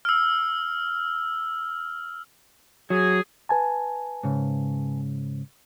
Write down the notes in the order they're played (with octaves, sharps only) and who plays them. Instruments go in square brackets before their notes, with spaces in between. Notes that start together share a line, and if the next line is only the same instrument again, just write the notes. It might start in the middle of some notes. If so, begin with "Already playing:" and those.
[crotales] E6 F6
[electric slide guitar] F#3 [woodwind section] G#4
[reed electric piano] B4 G#5 A5
[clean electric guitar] G#2 C#3